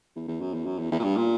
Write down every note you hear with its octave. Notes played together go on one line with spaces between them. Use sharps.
E2
E2
F#2
E2
F#2
E2
E2
A#2
G2
A#2